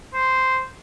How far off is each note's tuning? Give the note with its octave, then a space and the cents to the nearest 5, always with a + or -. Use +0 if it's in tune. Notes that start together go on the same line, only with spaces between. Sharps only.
C5 -5